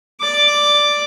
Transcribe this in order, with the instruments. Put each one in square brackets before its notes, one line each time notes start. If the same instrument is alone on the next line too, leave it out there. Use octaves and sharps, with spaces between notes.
[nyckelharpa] D5 D6